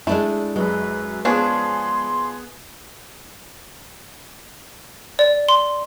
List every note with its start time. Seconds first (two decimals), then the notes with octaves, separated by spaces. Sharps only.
0.07 G#3 A3 D4 E4
0.56 F#2 F#3 G#3 B4
1.25 F3 B3 C#4 D4 G#4 C6
5.19 D5
5.49 C6